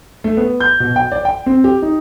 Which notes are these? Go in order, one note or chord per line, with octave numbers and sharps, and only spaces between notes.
A3
B3
G6
B2
G5
D5
G5
C4
G4
D#4